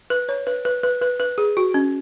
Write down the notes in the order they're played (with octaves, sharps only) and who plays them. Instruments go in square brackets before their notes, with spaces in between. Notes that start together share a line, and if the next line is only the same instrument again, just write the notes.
[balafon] B4
C#5
B4
B4
B4
B4
B4
G#4
F#4
C#4